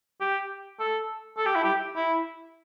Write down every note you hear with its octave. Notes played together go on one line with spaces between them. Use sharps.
G4
A4
A4
G4
E4
G4
E4